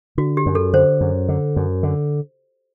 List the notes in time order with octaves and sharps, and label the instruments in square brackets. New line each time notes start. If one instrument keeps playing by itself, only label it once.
[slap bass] D3 [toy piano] F#4
[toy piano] G4
[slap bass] F#2
[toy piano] A4
[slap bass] D3 [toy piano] C5
[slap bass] F#2
D3
F#2
D3